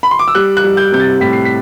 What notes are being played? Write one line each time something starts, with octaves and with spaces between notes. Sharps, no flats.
B5
C6
D6
E6
G3 F#6
F#6
G3
G6
C3 G6
A6
A2 B6
C7
B6